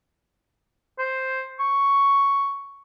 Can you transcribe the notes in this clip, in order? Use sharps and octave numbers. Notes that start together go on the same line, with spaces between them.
C5
C#6